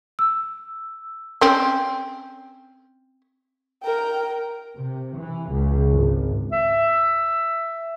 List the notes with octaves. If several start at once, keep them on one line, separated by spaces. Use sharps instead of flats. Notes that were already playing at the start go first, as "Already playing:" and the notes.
E6
C4 C#4
A#4 G5
C3
E3
C#2
G#1
E5